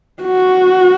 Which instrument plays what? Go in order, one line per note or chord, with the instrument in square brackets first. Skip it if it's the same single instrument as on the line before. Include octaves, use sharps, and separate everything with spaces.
[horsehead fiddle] F#4